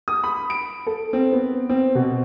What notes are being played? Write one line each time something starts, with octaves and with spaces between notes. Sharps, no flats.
D#6
B5
D7
A4
C4
B3
C4
B2